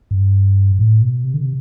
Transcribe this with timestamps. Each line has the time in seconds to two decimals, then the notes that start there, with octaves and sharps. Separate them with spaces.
0.11 G2
0.79 A2
1.02 B2
1.24 C3
1.34 D3
1.39 C3